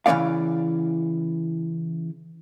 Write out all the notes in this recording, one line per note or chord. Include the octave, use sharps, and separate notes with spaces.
C#3 E3 C4 C#4 D5 F5